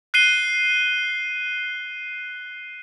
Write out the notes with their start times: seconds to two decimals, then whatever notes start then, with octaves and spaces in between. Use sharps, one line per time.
0.14 F#6 C7 D#7 G7